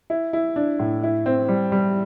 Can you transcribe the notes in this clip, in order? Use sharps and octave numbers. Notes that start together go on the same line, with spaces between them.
E4
E4
D4
A2
E4
C4
G3
G3